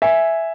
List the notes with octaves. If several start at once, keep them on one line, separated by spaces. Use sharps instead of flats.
E5 G#5